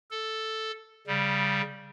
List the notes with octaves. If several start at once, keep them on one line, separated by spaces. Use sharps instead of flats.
A4
C#3 G3